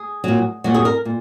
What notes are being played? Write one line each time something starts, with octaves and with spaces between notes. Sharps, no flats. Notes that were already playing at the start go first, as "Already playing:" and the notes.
Already playing: G#4
A#2 F#3
A#2 F#3 F#4
G#4
A#4
A#2